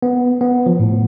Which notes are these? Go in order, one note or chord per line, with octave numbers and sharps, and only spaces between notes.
B3
B3
F3
A2